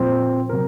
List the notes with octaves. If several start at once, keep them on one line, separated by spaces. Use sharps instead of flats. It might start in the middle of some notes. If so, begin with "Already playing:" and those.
Already playing: A#2 F3 C4 F4 C5
C3 F#3 A#4